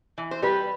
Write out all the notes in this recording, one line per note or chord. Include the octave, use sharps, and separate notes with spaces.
E3
C5
G3 B4